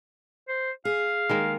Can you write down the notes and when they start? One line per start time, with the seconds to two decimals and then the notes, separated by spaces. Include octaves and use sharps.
0.48 C5
0.85 G#4 F5
1.29 D#3 G#3 A#3